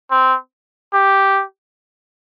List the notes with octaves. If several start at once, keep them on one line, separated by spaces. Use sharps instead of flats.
C4
G4